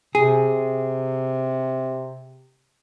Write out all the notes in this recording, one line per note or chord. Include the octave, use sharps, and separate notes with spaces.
C3 G#4